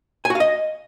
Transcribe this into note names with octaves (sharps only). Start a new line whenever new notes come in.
G#5
F#4
F5
D#5